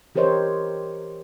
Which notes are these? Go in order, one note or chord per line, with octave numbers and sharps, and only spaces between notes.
E3 G4 A#4 C5 C#5 D#5